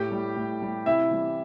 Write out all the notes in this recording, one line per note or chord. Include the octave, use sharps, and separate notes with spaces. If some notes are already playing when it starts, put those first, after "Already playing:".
Already playing: A2 G4 G5
G3
A2
G3
C3 E4 E5
E3 G3